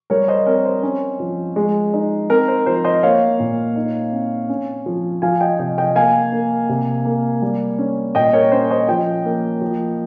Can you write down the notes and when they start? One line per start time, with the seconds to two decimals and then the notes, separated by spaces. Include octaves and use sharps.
0.10 G3 A#4 C#5
0.28 C5 D#5
0.46 C4 A#4 C#5
0.65 C5
0.83 C#4
1.20 F3
1.56 G#3
1.94 D#4
2.30 C4 A#4
2.48 C5
2.66 F3 C5
2.84 C5 D#5
3.03 A#3 C#5 F5
3.40 A#2
3.76 D#4
4.13 C4
4.49 C#4
4.86 F3
5.22 F3 F5 G#5
5.41 D#5 G5
5.59 C3 D#5 G5
5.78 D#5 G5
5.96 A#3 F5 G#5
6.32 A#3
6.69 C3
7.05 A#3
7.42 G3
7.78 C#4
8.15 A#2 D#5 G5
8.33 A#4 C#5
8.51 C#4 C5
8.71 C5 D#5
8.88 F3 D#5 G5
9.25 A#3
9.62 F3